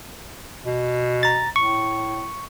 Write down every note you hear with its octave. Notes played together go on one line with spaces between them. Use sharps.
B2
A#5 A6
A2 C#6